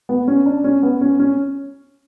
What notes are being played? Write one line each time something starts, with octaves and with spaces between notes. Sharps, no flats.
B3
C#4
D4
C#4
B3
C#4
C#4